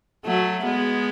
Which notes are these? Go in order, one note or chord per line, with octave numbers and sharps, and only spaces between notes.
F#3 A3
G#3 B3